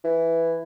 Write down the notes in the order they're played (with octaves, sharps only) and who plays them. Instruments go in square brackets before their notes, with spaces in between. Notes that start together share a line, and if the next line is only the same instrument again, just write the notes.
[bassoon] E3